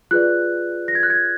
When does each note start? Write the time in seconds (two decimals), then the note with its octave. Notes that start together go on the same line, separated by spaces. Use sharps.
0.11 F4 G#4 B4 D5 F#6
0.88 A#6
0.95 G#6
1.03 F#6
1.10 G#6